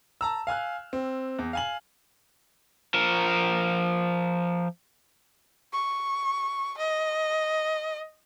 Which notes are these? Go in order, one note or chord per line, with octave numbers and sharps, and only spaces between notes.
A5 A#5 E6
F5 G#5 F6 F#6
C4
E2
F5 G#5 F#7
F3 A#4
C#6
D#5